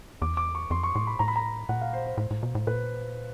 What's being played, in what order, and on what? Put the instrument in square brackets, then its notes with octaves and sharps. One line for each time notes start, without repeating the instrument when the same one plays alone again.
[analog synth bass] E2 [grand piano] D6
[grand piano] D6
C#6
[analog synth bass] F2 [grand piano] C6
[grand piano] C#6
[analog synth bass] A2 [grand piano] C6
[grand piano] B5
[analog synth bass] A2 [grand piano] A#5
[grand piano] B5
A#5
[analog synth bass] A#2 [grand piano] F#5
[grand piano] F5
C5
C5
[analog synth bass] A2
A2
B2
A2
[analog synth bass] A#2 [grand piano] B4